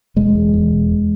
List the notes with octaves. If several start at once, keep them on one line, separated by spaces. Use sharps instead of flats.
E1 G#3
E2
E2
E1